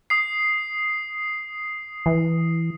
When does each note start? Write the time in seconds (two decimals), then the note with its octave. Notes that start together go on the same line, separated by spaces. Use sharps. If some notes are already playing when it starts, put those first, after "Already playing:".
0.10 D#6 C7
2.06 E3